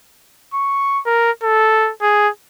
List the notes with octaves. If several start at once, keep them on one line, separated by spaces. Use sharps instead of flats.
C#6
A#4
A4
G#4